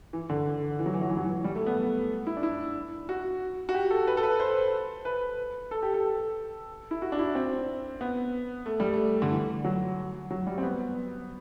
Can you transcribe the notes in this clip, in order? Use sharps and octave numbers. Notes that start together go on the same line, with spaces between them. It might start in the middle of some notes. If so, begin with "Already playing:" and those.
E3
D3
E3
F#3
E3
F#3
E3
F#3
E3
G3
A3
B3
E4
D4
E4
F#4
F#4
G4
A4
B4
A4
B4
C5
B4
A4
G4
A4
E4
F#4
D4
E4
C4
B3
A3
G3
A3
D3
E3
F#3
F#3
G3
C4
B3